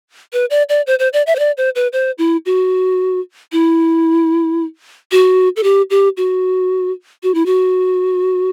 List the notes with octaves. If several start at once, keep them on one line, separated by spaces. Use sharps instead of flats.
B4
D5
D5
C5
C5
D5
E5
C5
D5
C5
B4
C5
E4
F#4
E4
F#4
A4
G4
G4
F#4
F#4
E4
F#4